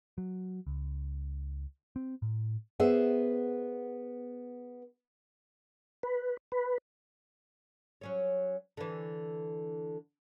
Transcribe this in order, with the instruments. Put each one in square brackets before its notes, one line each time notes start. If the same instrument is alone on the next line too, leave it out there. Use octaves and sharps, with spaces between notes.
[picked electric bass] F#3
C#2
C4
A2
[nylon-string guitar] B3 G#4 C5 E5
[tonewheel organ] B4
B4
[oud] F#3 C#4 C#5
D3 E3